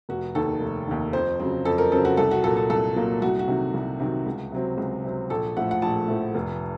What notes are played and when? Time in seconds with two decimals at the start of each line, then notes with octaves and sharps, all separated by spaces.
0.09 F1 F#4
0.35 D#2 D#3 A4
0.61 F1
0.88 D#2 D#3
1.13 F2 C5
1.40 C#3 F#3 C4
1.65 F2 A4
1.78 A#4
1.92 C#3 F#3 C4 A4
2.05 F#4
2.17 C2 A4
2.31 F#4
2.43 A#2 F#3 A#3 A4
2.57 A4
2.70 C2 A4
2.96 A#2 F#3 A#3
3.22 C2 F#4
3.39 F#4
3.48 C3 D#3 F#3
3.74 C2
4.00 C3 D#3 F#3
4.26 C#2
4.52 C3 F#3 C4
4.78 C#2
5.04 C3 F#3 C4
5.30 A#1 A4
5.56 A2 F3 A3 F#5
5.71 F#5
5.82 A#1 A5
6.08 A2 F3 A3
6.35 F1